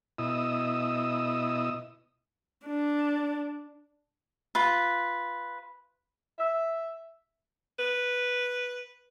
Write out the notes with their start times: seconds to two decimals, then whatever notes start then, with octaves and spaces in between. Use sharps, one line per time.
0.18 B2 E4 D#5 D#6 E6
2.66 D4
4.55 F4 B4
6.39 E5
7.79 B4